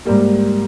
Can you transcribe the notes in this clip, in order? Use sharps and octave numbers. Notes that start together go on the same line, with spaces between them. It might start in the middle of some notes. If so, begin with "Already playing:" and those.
G#2 G3 A#3